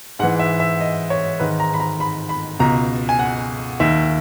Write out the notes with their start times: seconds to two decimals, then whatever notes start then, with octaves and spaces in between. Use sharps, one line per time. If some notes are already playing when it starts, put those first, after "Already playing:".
0.19 G#2 F#5
0.23 E3
0.39 E5
0.60 E5
0.80 D#5
1.10 C#5
1.40 G#2 D#3 B4
1.60 A#5
1.74 B5
1.80 A#5
2.00 B5
2.29 B5
2.59 C#2 B2 A#5
3.09 G#5
3.19 F#5
3.80 D#2 D#3 E5